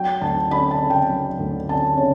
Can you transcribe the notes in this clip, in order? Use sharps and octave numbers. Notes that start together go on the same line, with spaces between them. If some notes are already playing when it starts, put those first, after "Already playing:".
Already playing: F#3 G5
D2 A5
C#4 B5
A5
C#3
G5
F#3
D2
C#4 A5
C#3 C#5